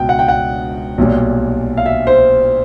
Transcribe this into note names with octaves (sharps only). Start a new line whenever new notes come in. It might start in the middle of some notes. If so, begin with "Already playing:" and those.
Already playing: C#2 B2 G5
F#5
G5
F#5
B1 A#2 G3
F5
E5
C5